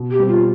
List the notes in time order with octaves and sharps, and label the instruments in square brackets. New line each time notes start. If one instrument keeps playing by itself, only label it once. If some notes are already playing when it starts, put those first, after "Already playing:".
Already playing: [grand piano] B2
[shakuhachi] G4
[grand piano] G3 C4
[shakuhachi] F4